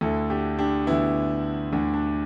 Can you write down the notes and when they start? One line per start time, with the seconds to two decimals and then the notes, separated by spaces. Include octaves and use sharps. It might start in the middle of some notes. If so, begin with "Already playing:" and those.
0.01 D2 D3 E4 A4
0.30 D4 G4
0.59 D4 G4
0.87 D2 D3 B3 E4
1.73 D2 D3 D4
1.94 D4